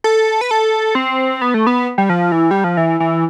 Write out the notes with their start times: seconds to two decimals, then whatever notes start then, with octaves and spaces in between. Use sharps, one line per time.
0.04 A4
0.41 B4
0.51 A4
0.95 C4
1.41 B3
1.54 A3
1.67 B3
1.98 G3
2.09 F3
2.32 E3
2.51 G3
2.64 F3
2.77 E3
3.00 E3